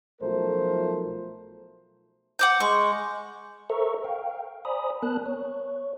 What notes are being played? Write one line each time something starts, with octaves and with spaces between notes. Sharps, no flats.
B1 F3 A3 A#4 C5
F#5 D6 G6
G#3 C#6
A4 A#4 C5 E5 A#5 C#6
F5 G5
C5 D5 G#5 A#5 B5 D#6
B3 A#4 A5 F#6
C#5